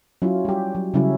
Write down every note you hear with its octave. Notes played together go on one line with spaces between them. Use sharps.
F#3 C#4 E4 F4
G3 G4
F#3
C#3 F#3 G3 C#4 E4